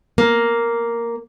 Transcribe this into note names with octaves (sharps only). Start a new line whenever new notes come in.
A#3